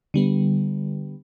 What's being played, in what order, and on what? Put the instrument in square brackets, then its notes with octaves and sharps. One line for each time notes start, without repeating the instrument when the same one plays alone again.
[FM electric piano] D3 G3 B3